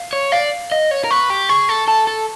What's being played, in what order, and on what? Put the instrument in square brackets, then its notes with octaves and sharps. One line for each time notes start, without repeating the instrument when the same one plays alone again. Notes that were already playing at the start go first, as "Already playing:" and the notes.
Already playing: [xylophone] F5
[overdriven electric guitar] C#5
[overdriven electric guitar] D5 [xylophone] F5
[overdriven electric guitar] D#5 [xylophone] F5
[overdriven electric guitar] C#5
A#4
[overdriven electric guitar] B4 [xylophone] C#6
[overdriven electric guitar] G4
[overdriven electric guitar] G#4 [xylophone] C#6
[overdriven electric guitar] A4
[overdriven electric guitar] A4 [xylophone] A5
[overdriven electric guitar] A4